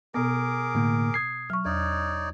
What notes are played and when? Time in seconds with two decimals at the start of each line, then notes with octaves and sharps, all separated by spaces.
0.14 B2 B3 G#4 A#4 D6
0.75 A2 D3 A#3
1.14 D#6 G#6 C7
1.50 F#3 C#6 F6
1.65 E2 D#4 C#5 D5